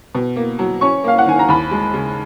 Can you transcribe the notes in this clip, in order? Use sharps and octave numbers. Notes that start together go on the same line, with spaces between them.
B2
A#3
F#3
C#4 C#6
A#3 F5
F#5
D#3 G#5
A#5
D#2 B5
G#3
C#3